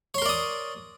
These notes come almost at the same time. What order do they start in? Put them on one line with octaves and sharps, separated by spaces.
C#5 C6 A#4 D5 D#6